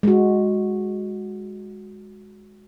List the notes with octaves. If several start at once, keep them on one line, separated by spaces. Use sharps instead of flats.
G#3 F#4